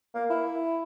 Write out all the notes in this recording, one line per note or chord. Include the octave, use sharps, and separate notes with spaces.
A#3
E4